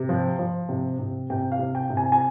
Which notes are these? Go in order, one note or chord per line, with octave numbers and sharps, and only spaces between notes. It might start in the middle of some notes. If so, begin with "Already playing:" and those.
Already playing: C3
F3
F3
C3
C3
C3 G5
F5
C3
G5
C3
G#5
G#5